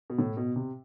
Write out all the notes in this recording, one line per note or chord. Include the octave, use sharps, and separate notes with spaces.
B2
A2
B2
C3